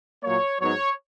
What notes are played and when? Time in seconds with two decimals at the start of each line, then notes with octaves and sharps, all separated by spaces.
0.23 A#2 F#3 A#3 C#5
0.59 G#2 F#3 B3 D#4 C#5